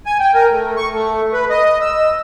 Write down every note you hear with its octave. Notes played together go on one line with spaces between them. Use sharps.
G#5
G5
A#4
A3
C#6
A3
B4
D#5
E6